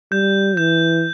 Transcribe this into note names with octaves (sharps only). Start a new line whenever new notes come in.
G3 G6
E3 G6